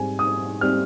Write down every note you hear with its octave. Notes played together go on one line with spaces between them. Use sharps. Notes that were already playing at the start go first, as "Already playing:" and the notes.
Already playing: G#2 G3 C4 G#5
D#6
G3 C4 F6